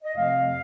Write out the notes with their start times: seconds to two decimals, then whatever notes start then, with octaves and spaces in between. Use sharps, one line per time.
0.04 D#5
0.16 F2 C3 F3 A3 F5